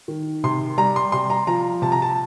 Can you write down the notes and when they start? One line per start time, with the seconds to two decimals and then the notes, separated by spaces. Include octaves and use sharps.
0.08 D#3
0.44 C3 C6
0.78 G3 A#5
0.96 C6
1.12 C3 C6
1.30 A#5
1.47 F3 A#5
1.82 C3 A5
1.92 A#5
2.02 A5